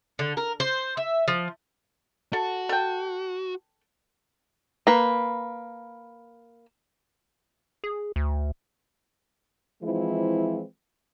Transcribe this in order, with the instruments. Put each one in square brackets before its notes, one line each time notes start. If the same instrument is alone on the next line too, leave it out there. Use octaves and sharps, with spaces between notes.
[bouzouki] D3
A#4
C5
E5
F3
[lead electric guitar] F#4 [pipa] A4
[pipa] A4 G5
[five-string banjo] A#3 B4
[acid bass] G#4
D2
[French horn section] E3 F3 G#3 C4 E4 F4